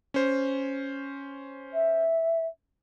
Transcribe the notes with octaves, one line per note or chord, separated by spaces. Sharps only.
C#4 C5
E5